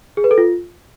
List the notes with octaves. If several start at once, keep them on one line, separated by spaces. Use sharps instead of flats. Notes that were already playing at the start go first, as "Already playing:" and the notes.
G#4
B4
A4
F4